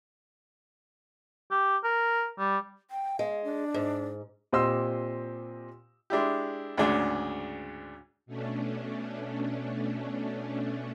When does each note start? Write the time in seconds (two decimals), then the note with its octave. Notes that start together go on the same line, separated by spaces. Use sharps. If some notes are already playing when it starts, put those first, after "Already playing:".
1.51 G4
1.84 A#4
2.39 G3
2.91 G5
3.19 G#3 F5
3.44 D4
3.74 G#2
4.53 A#2 C4 G4 D#5 C6 E6
6.10 G#3 D4 E4 G4
6.78 D2 G#2 C#3 D4 G#4
8.26 B2 A3 C#4 D4